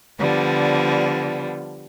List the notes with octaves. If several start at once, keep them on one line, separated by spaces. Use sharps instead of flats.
D3 F3 G3 B3